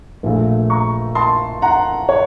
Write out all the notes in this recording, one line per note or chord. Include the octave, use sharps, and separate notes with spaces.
A#1 A#2 A3
A#5 C#6
A5 C6
F#5 A#5
C#5